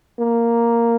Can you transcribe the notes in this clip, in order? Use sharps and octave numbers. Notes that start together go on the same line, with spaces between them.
A#3